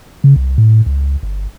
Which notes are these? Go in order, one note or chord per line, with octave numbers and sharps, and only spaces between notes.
C#3
C2
A2
C#2
G1